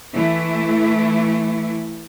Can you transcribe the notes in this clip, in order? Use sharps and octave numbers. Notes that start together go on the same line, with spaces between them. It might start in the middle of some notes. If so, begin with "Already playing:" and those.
E3 A3 E4